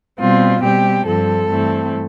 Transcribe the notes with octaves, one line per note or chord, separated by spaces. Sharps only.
B2 G3 C4 F4
B2 G3 C4 G4
G2 F3 C4 A4
G2 E3 A3 C4